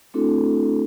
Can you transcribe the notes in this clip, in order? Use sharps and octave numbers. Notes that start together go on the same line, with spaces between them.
A3 C4 D4 E4 F#4 A4